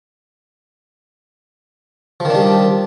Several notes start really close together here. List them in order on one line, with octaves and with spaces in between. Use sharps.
F3 D#3 D4 G3